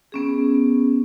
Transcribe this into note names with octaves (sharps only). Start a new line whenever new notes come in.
B3 C#4 G#4